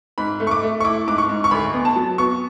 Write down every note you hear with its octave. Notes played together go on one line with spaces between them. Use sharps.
G#2 B5
A3
C#6
D6
A3
C#6
E4 D6
G#2 D6
C#6
G#2
C#6
D2 B5
B3
A5
F#3
B3 C#6